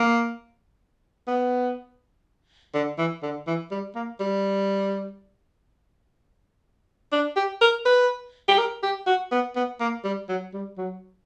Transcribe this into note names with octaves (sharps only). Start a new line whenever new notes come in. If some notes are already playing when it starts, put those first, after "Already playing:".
Already playing: A#3
B3
D3
E3
D3
E3
G3
A#3
G3
D4
G4
A#4
B4
G4
A#4
G4
F#4
B3
B3
A#3
G3
F#3
G3
F#3